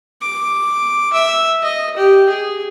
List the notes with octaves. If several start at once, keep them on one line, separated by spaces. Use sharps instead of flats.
D6
E5
D#5
G4
G#4